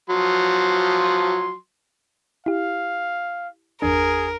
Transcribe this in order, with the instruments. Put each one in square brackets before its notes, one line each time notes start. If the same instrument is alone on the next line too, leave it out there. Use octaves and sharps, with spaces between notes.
[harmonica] F3 F#3 C6
[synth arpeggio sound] E4 G4 [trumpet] F5
[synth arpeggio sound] G1 E2 D4 [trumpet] G#4 [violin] A#4